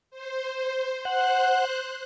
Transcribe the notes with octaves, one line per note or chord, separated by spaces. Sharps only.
C5
C5 F#5 F#6